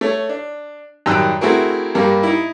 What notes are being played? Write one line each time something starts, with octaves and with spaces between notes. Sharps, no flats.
A3 C#5
D4
F#2 D#3 G3 G5 E6 F#6
A3 C4 E4 F#4 G#4 A#4
G2 G3 A#3
D#4 E4